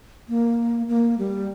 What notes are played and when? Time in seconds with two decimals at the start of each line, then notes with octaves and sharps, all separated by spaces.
0.29 A#3
0.88 A#3
1.18 G3